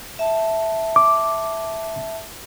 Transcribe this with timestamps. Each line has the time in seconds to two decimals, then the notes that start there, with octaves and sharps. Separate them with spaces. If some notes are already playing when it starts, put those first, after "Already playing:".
0.19 E5 A5
0.96 D6